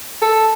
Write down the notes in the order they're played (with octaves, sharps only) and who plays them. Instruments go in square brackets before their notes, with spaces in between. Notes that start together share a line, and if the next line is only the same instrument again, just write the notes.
[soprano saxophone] A4